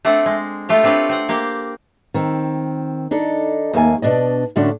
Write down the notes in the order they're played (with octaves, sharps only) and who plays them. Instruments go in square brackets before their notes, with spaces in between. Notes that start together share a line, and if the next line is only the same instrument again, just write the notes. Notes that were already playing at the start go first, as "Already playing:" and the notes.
[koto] A3 C4 D4 F#5
G#3
A3 F4 G4
C4 D4 G4 B4 C#5
C4 F#5
A#3 G4
[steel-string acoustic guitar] D#3 C4
D4 D#4 A4
D#2 A3 A#3 G#5
B2 D4 D5 D#5
A2 D3 A3 C#4 D4 F#4